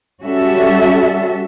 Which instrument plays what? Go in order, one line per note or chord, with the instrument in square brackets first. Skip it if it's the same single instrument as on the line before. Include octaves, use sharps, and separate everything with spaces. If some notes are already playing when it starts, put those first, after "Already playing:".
[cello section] G3 C#4 F#4 A4 E5